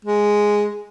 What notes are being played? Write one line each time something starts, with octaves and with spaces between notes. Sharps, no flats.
G#3